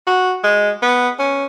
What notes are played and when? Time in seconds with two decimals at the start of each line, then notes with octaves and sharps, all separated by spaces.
0.07 F#4
0.44 G#3
0.82 B3
1.19 C#4